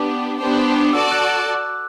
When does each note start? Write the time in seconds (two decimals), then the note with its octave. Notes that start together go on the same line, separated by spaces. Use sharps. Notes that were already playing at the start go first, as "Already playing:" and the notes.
Already playing: B3 D4 G4 D6
0.39 B3 D4 G4 C5
0.85 D6
0.93 F#4 A4 D5 A5 E6
1.11 F#6